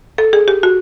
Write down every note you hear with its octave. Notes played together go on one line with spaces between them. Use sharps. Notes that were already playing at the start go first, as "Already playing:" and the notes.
A4
G#4
G4
F#4